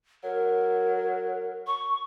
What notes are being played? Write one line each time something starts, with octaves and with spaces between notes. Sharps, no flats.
F#3 A#4
C#6